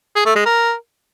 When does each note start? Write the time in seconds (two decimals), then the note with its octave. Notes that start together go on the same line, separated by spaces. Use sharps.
0.16 G#4
0.26 A3
0.36 G#3
0.46 A#4